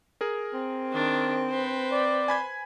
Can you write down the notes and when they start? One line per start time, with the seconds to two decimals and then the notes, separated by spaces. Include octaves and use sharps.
0.21 G#4 A#4
0.53 C4
0.92 D#3 D4
1.49 B4 C5
1.92 D5
2.28 G#5 B5 G#6